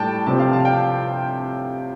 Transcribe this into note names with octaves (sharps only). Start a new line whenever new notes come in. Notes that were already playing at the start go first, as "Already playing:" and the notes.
Already playing: A2 G3 D5 G5 A5
C3 F3 C4 A5
F5
A5
F5
G5